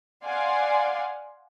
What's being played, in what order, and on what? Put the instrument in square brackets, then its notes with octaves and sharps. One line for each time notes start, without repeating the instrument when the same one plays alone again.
[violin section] D5 F5 F#5 G#5 C6